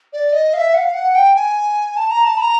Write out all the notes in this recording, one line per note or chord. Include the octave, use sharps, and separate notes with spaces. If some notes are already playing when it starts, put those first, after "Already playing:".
D5
D#5
F5
E5
F#5
F5
F#5
G5
G#5
A5
A#5
A5
B5
A#5